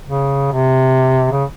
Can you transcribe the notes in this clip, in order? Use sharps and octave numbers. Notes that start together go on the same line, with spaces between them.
C#3
C3
C#3